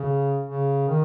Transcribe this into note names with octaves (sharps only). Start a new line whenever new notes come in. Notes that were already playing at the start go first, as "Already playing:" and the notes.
Already playing: C#3
C#3
D#3